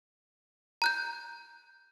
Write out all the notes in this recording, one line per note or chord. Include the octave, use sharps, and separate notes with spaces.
A#5 F#6 G6